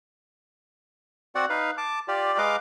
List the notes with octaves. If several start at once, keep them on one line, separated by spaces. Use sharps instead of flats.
C4 F#4 D5 F#5
D#4 B4 F5
A5 D6
F4 G4 D5
G#3 B4 D#5 F5 A#5 D6